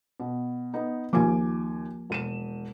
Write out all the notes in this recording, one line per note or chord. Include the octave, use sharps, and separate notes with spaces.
B2
B3 D#4
D#2 F3 A#3 G#5 D6
E1 D#7 E7